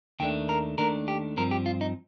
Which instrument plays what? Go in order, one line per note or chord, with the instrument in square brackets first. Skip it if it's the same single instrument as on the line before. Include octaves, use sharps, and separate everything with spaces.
[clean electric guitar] D#2 D#3 A3 D4 G5
A#4
D#2 D#3 A3 D4 A#4
G4
G2 F3 C4 A#4
G4
F4
D#4